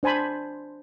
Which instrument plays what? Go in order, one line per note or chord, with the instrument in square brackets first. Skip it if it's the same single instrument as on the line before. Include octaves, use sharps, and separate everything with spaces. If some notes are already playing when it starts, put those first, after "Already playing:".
[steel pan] D4 C5 G#5 A5 B5